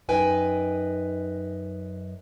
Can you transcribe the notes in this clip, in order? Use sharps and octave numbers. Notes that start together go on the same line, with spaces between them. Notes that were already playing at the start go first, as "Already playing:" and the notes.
F#2 D#4 B4 G5 G#5